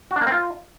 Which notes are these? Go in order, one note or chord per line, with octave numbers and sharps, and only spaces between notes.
F#4
D4
A#3
C4
F4